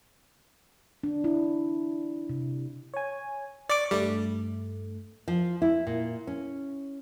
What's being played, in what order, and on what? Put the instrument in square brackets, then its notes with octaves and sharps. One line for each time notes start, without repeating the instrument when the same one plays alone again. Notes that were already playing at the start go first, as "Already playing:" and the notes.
[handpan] D4
E4
C3
[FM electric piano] C#5 G#5
[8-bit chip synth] D5 D6 [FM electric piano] C#6
[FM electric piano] G2 A3 [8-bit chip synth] G3
[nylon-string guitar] F3
E4
A#2
C#4